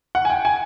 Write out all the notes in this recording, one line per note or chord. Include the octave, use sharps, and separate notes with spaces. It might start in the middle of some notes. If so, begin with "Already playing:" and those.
F#5
G#5
G5
G#5